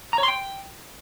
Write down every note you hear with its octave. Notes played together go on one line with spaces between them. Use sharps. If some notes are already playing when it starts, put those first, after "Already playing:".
A#5
C#5
C6
G5